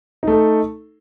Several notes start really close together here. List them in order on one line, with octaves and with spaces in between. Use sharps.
D#4 A3 A4